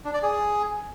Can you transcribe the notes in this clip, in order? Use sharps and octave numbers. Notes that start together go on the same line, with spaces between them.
D4
D5
G#4